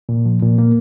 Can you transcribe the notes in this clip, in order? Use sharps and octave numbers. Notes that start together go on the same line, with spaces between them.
A#2
F3
A#2
A#3